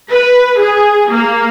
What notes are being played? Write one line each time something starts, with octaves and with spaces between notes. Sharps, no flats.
B4
G#4
A#3